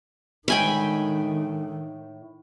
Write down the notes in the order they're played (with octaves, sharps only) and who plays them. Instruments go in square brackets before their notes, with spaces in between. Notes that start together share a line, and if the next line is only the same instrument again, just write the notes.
[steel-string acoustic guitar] A2 [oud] D3 G#3 [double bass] D#3 [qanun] G5 G#5 B5